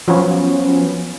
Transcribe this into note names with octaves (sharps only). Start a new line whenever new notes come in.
F3 F#3 B3 C#4